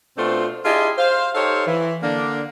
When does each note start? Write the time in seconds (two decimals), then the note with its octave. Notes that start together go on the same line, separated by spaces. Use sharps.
0.18 B2 A3 C4 D4 F4 C5
0.65 D4 E4 F4 G4 G#4 D#5
0.97 C5 F5
1.35 D#4 G4 A4 C5 C#5 F5
1.67 E3
2.03 D3 A#3 D4